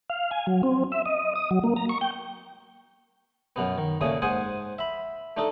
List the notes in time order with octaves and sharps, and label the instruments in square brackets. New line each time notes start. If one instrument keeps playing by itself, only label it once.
[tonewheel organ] F5
G#5
F#3
C4
E5
D#5
D#6
F#3
A#3
A#5
C#6
G5
[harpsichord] F#2 B2 B3
D#3
A#2 C#3 A3 D#6
G#2 C5 F#5 G#5 D#6
E5 B5
A3 D4 D#4 A4